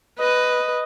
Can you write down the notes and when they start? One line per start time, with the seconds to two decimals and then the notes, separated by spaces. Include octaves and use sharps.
0.18 B4 D#5